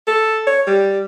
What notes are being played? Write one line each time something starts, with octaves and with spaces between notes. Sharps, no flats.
A4
C#5
G3